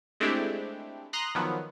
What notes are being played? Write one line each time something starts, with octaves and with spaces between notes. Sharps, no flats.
G#3 A3 C4 D4 E4 G4
A#5 C6 D#6 F#6 A#6
D#3 F3 F#3 B3